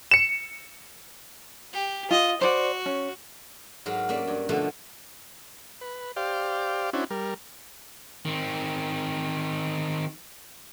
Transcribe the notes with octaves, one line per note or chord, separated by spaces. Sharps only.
C#7 E7
G4
F4 D#5
F#4 C5 D5
C#4
G#2 F#3 A#4 F5
A#3 C#4 D5 E5
G2
B2 D3 F3 A3 A#3
B4
G4 C5 D5 F5
C#4 D4 E4 F#4 C5
G3 A#4
D#3 C4